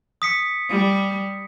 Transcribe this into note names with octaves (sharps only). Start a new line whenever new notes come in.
D#6 B6 C#7
G3